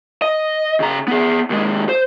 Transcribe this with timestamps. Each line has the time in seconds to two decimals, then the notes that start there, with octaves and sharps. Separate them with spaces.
0.22 D#5
0.80 C#3 A#5
1.08 B3 G#4
1.50 D#2 G#3
1.89 C5